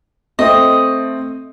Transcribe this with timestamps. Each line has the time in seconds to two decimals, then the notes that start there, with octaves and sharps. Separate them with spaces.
0.39 A3 C4 D#5